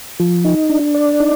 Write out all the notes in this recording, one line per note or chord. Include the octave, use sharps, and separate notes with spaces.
F3
D#4
D4
D5
D#4